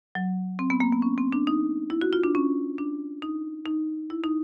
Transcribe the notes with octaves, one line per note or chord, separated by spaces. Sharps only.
F#3
C4
B3
A#3
B3
C#4
C4
D4
D#4
E4
F#4
F4
D4
C#4
D4
D#4
D#4
E4
D#4